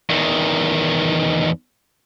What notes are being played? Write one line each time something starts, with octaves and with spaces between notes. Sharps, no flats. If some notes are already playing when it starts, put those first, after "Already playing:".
E2 D#3